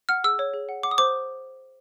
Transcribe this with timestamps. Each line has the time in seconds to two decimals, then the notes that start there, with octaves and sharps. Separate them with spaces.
0.09 F#5 F6
0.24 G#4 E6
0.39 C#5
0.54 G#4
0.69 F#5
0.83 F#5 D6
0.91 D#6
0.98 C5 D6